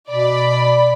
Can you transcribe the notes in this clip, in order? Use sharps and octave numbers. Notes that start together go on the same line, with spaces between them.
B2 D5 B5